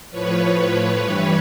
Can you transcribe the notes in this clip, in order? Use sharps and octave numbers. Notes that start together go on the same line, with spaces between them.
A2 F3 B4 C#5
G2 E3 G3